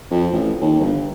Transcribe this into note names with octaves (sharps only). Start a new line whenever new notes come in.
F2
A1
D#2
G1